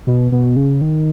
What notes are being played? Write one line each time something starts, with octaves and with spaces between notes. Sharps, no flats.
B2
B2
C#3
D#3